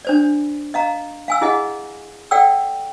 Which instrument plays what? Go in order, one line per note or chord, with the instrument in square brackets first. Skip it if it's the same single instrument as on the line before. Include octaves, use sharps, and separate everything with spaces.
[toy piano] D4 C5 D5
D#5 F5 A#5
F5 G#5 E6
E4 G#4 D#5 F#5 G#5
A4 D5 F#5 G5 E6